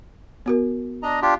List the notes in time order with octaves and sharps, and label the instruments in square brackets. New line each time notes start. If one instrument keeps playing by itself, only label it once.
[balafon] B3 F#4 A#4
[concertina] D4 D#5 A#5
D4 F4 G4